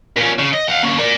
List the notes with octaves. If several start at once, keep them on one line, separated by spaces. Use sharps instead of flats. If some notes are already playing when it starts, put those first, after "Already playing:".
A#2 C#4
C#3
D#5
F5 F#5
A#3 C#4
A#4 D5